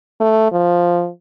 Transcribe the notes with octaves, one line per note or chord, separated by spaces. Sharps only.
A3
F3